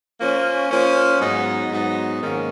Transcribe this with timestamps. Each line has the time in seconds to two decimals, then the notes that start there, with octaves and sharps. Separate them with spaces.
0.19 F3 A#3 C#4
0.71 F3 A#3 C#4
1.20 G#2 F#3 B3 D#4
1.71 G#2 F#3 B3 D#4
2.22 G#2 D#3 A#3 C#4